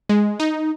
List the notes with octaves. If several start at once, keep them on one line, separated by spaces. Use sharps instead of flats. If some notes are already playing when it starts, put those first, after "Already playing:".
G#3
D#4